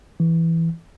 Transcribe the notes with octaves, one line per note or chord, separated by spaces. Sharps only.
E3